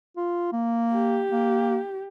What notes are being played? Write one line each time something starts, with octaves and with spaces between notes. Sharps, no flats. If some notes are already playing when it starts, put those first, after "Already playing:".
F4
A#3
G4
A#3